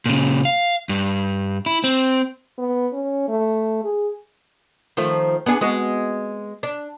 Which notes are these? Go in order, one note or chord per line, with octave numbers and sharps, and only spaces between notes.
A#2 C#3
F5
G2
E4
C4
B3
C#4
A3
G#4
D#3 F3 A3
B3 D4 G#4
G#3 B3 F#4
D4